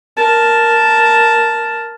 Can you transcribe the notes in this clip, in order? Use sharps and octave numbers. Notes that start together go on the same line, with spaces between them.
A#4 A5